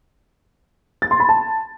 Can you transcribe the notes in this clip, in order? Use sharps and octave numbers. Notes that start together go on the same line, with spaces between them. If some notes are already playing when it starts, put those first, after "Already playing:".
A6
C6
B5
A5